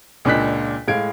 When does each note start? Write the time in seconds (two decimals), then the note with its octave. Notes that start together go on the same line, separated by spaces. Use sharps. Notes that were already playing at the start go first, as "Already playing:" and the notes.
0.25 C#2 A#2 D4 D#5 F#6 B6
0.88 A2 G#3 F5 G#6 D7